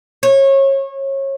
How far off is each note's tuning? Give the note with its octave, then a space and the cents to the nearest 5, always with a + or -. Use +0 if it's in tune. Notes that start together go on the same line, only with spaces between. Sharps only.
C#5 -25